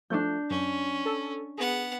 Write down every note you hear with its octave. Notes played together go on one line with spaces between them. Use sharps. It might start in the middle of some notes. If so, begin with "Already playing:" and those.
F3 A3 D4 G6
F#2 C#4
A4
B3 G#4 F#5